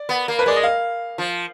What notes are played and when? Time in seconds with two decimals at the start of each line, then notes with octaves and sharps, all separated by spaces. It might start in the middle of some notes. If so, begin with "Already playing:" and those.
Already playing: D5
0.09 B3
0.28 A#3
0.39 B4
0.46 G#3 D5
0.56 D#5
0.63 F5
1.18 F3